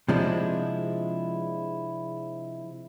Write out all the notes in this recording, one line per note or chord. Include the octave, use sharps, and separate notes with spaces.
C3 F3 G#3 D4 E4